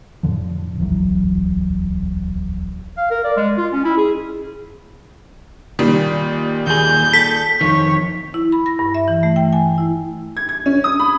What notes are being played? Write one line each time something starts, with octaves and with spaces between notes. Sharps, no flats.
F2 A2 D3 F3
D1 A#1 E2 F#3
F5
A#4
D5
G#3
F4
C#4
E4
G#4
A#2 D#3 G3
D#2 G#4 G6
A4 B6
F2 D#3 C#5
E4
B5
A#6
G2
E5
E3
A3
G5
G#5
E4
G#6
G#6
C#4
D#6
B5